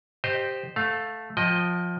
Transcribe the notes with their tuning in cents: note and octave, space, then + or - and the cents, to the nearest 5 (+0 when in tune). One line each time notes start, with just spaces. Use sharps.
G4 +0 C5 +0 D#5 -20
A3 +0 F5 +20
F3 +15 D#5 +0 G5 +0